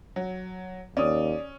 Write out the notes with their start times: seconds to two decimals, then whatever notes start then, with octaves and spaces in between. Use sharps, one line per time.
0.16 F#3
0.97 D#2 C#4 D5 D#6